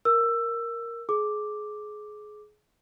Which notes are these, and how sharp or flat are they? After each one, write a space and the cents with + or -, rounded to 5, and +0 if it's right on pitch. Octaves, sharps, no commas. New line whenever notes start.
A#4 +0 E6 +15
G#4 +25 D6 +0